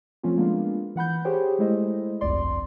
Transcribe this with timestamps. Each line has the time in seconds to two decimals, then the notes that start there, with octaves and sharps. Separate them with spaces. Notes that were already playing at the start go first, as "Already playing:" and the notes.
0.23 F3 A3 C4 C#4 F4
0.36 G#3 A#3 B3 D4 F4
0.96 E3 F#5 B5 G6
1.25 G4 G#4 C5 C#5 G5
1.59 G#3 A3 E4 C5 D#5
2.21 G1 C2 F2 D5 C6